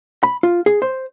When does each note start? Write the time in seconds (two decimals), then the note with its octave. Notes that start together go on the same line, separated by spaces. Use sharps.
0.23 B5
0.43 F4
0.66 G#4
0.82 C5